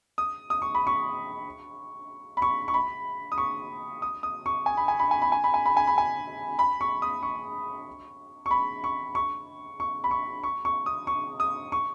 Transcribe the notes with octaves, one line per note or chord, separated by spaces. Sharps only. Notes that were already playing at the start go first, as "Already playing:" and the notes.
D#6
D#6
C#6
B5
C#6
B5
C#6
C#6
B5
D#6
C#6
D#6
D#6
C#6
G#5
B5
G#5
B5
G#5
B5
G#5
B5
G#5
B5
G#5
B5
G#5
B5
C#6
D#6
C#6
C#6
B5
C#6
C#6
C#6
B5
C#6
C#6
C#6
D#6
C#6
D#6
C#6